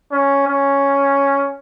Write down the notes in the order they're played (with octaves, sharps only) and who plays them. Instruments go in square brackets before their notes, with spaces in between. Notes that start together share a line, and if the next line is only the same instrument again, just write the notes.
[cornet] C#4
C#4